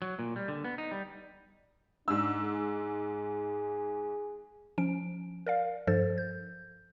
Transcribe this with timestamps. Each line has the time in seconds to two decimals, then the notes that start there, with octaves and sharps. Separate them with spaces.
0.02 F#3
0.19 A#2
0.36 G3
0.48 D3
0.64 B3
0.78 D#4
0.92 G3
2.08 G#2 D4 E6
2.43 G#4
4.78 F3 C#4 D7
5.46 A#4 D5 F5
5.87 G2 F3 A4 C5 A6
6.18 G6